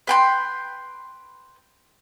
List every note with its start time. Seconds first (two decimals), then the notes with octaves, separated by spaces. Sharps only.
0.07 B4 G5 C6